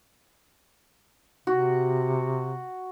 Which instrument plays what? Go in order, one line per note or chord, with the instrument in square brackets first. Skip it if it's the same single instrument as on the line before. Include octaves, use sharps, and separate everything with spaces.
[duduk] C3 [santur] F#4